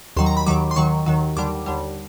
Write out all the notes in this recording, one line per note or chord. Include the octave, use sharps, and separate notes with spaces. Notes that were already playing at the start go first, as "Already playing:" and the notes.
D#2 D#3 F#3 C6
A#5
B5
D#2 D#3 F#3 D6
C6
D#2 D#3 F#3 C#6
D#2 D#3 F#3
D#2 D3 G3 D6
D#2 D3 G3